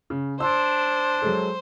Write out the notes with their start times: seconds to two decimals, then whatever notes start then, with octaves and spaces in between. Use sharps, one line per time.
0.10 C#3
0.40 D4 C5 C6 E6
1.22 F#3 G#3 A4